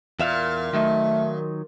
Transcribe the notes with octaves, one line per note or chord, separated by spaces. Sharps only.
E2 A#2 E5 F5
D#3 F#3 A3 D#4